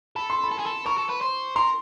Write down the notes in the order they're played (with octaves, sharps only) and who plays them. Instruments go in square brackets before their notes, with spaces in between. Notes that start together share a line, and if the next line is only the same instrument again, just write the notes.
[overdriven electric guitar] A4 [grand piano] B5
[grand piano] C6
B5
[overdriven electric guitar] A4
G#4
A4
[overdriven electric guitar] A#4 [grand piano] C#6
[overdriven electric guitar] A4
B4
C5
[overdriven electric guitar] A#4 [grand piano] C6